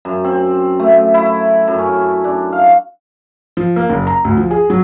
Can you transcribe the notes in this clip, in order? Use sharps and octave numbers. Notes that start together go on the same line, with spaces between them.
F#2
C4
A3
E4
F#2
C#4
D4
F5
F3
A#3
F#1
A#5
D2
F3
G#4
F#3